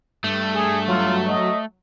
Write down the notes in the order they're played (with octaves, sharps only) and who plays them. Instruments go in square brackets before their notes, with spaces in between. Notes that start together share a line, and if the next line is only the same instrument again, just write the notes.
[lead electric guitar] G2 [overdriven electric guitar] A3
[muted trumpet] G#4
[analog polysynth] F#3 [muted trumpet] F4
[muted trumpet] D#5